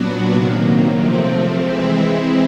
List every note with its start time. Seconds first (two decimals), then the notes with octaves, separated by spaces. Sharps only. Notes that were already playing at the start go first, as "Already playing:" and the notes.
Already playing: A#2 F#3 B3 D4 F#4
0.32 C3 D#3 F#3 A#3
0.97 C3 F3 A3 C4
1.62 E3 G#3 C4 E4